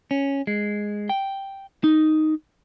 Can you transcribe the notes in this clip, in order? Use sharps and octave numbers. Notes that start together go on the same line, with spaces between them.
C#4
G#3
G5
D#4